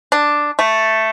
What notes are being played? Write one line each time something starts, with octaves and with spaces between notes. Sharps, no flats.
D4
A3